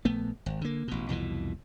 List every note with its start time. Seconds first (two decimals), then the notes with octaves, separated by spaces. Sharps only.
0.05 A#1 A3 B3
0.46 G#1
0.61 D3 A#3
0.88 A1 B2
1.09 C2 F2 B2 E3